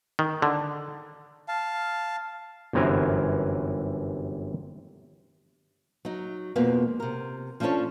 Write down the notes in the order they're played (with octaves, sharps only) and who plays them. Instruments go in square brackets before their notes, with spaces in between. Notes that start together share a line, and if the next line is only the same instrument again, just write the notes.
[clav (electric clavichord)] D#3
D3
[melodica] F5 A5
[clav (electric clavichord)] G1 F#2 C3 E3 A#4 G#5
[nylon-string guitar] F#3 D#4
F2 B2 G#3 A#3 B3
C3 A#4
F3 C#4 D4 F#4 A4 C#5